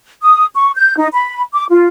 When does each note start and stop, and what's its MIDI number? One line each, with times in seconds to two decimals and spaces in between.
0.22 0.46 87
0.55 0.71 85
0.76 0.96 91
0.97 1.07 63
1.14 1.41 83
1.54 1.65 86
1.69 1.88 65